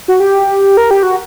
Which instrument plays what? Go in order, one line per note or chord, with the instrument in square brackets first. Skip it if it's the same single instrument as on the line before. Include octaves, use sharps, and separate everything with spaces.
[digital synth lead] F#4
G4
A#4
G4
F#4